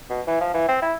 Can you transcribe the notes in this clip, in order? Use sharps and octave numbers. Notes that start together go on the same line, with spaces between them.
B2
E3
F3
E3
C4
E4